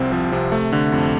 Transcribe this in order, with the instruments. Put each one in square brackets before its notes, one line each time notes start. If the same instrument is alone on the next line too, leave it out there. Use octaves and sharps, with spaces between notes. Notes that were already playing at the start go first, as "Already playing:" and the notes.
Already playing: [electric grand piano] C2 C3 F3 C4
F3
C3
A3
D3
F2